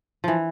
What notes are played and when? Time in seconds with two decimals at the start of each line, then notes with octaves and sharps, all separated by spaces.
0.24 E3 F3